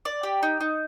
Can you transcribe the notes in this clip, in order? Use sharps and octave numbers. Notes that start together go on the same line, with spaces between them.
D5
G4
D#4
D#4